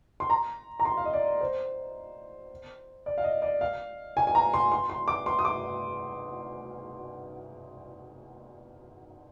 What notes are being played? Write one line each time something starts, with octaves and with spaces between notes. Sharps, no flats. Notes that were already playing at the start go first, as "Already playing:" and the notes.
C6
A#5
A#5
C6
F5
D#5
D5
C5
D5
F5
D#5
D5
F5
G#5
G#5
A#5
C6
C6
C6
D6
C6
D#6
D6